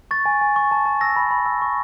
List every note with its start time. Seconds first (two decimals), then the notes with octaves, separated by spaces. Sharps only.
0.11 C#6 A6
0.26 G#5
0.41 G#5
0.56 C#6
0.71 A5
0.86 A5
1.01 E6 A#6
1.16 B5
1.31 B5
1.46 E6
1.62 C#6